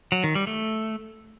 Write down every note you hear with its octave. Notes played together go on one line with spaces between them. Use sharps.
F#3
D#3
G3
A3